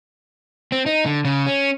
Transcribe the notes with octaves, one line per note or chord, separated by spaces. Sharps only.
C4
D#4
D3
C#3
C#4